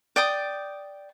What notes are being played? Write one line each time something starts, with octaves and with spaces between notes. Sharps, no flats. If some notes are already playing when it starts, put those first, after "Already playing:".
D5 G5 D#6